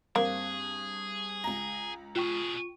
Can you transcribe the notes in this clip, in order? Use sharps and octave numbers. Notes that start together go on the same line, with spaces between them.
G2 A#3 C4 G#4
C#2 A#5
B2 F4 G#4 G5 C#6